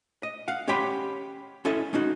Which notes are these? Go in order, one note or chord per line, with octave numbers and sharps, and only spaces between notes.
D#5
F5 F#5
C#4 G4 C#5 G5 B5 C6
C#4 E4 A4 D#5 E5
G#3 C#4 D#4 F#4